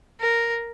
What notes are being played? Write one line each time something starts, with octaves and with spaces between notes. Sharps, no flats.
A#4